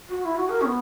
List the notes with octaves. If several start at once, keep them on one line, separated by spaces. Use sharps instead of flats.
F#4
E4
F#4
A#4
C#4
B3